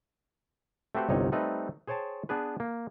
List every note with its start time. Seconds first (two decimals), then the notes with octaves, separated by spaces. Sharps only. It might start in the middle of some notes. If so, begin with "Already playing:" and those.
0.95 A3 C4 F#4 G4 B4 C5
1.09 G1 C2 C3 D#4 C#5
1.32 G3 A3 C4 D#4 B4
1.87 G#4 C5 C#5 G5 A5
2.29 B3 D4 G#4 B4
2.60 A#3